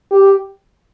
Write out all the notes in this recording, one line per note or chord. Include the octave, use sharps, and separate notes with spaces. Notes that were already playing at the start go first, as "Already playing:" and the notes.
G4